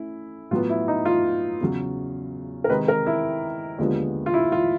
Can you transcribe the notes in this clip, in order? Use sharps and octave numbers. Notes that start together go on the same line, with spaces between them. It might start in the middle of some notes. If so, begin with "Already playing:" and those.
Already playing: A3 C#4 E4
A2 F#3 B3 F4
E4
D#4
F4
E2 C#3 F#3
A#4
C3 D#3 G#3 C4 B4
A#4
E4
D#2 D3 F3 G#3 B3
F4
E4
F4